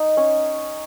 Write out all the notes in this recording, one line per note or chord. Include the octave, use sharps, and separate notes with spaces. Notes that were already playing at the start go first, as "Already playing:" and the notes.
Already playing: D#4
C#4